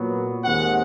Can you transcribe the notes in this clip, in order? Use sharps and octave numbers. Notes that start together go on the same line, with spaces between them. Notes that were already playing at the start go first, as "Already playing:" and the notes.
Already playing: A#2 F#3 B3
D#2 D#3 G#3 C4 F#5